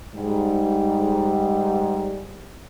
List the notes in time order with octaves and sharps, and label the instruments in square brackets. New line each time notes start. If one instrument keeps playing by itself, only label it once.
[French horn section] G#2 G3